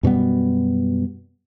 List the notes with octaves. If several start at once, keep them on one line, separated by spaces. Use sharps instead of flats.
F#2 B2 G3 B3